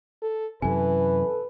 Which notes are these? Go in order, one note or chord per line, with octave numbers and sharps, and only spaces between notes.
A4
F#2 C3 E3 A4 B4 G#5